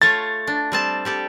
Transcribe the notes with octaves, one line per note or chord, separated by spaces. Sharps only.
A3 F4 C#5 A6
D4
G3 C4 A5
G3 G4 A4